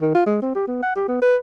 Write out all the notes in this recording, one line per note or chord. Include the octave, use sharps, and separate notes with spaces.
D#3
F4
G#3
C4
G4
B3
F#5
G4
B3
B4